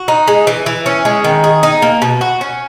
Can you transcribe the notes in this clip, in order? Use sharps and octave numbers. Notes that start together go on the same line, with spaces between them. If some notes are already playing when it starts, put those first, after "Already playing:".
Already playing: F#4
D#4
G#3
E3
E3
C#4
G#3
D#3
G#4
D#4
A#3
B2
F#4
C#4